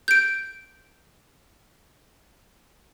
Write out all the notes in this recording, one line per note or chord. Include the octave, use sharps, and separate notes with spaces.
G6 D7